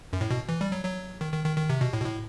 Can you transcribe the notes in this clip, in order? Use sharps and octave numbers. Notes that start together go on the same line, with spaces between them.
F#2
A2
B2
E3
G3
F#3
F#3
D#3
D#3
D#3
D#3
C3
B2
A2
B2
A2